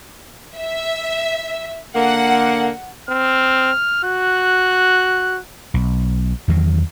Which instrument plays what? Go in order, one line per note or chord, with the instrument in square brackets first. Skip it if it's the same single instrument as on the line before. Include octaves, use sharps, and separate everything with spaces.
[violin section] E5
[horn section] D3 A#3 [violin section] F#5
[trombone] C4 [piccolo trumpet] F6
[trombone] F#4 [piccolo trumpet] F#6
[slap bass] B1
E2 D#3 F#3